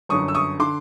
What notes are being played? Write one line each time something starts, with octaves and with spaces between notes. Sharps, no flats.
G1 F#2 D3 C#6 D#6
E6
C#6 D#6
D3 C6 D6